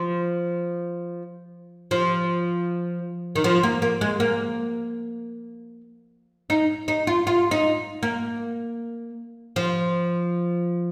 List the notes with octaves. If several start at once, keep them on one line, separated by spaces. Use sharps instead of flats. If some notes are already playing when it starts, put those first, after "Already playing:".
Already playing: F3
F3
D#3
F3
A#3
A#3
G#3
A#3
D#4
D#4
F4
F4
D#4
A#3
F3